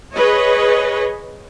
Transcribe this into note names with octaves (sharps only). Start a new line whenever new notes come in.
G#4 B4 C#5 D#5